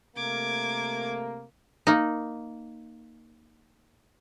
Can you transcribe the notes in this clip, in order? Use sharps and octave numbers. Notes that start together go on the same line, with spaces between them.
C3 A3 A#3 D6 G#6
A#3 D#4